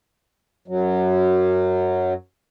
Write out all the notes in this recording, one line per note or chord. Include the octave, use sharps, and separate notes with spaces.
F#2 F#3